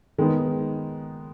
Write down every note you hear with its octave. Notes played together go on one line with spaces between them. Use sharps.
D#3 G#3 B3 D#4